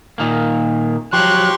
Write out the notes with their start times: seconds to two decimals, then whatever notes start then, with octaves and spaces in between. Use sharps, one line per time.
0.18 A#2 D#3 A#3
1.13 F3 F#3 G4 C6 C#6 F#6